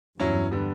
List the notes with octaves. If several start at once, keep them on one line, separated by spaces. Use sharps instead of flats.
E2 G2 F#3 C#4 E4
D3 G3 B3